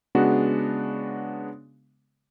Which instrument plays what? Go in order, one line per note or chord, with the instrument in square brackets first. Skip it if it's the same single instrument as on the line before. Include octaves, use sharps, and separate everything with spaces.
[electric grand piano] C#3 G#3 B3 D4 F#4